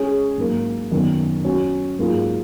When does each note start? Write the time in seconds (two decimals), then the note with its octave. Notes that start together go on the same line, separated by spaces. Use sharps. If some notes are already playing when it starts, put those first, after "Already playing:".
Already playing: G#3 C#4 G#4 C#5
0.38 G#2 F#3 A#3
0.91 F#2 D#3 F#3 B3
1.44 F#3 C#4 F#4
1.98 G#2 F#3 A#3 F4 G#4